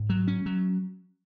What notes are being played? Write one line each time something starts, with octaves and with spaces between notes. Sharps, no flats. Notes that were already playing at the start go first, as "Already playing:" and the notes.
Already playing: G#2
F#3
C#4
F#3